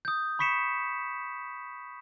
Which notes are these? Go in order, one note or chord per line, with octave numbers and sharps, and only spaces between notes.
D#6 G6
B5 C#6 B6 C#7 E7